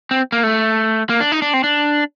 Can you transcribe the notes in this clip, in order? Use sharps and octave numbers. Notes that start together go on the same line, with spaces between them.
C4
A#3
A3
A#3
D4
D#4
D4
C4
D4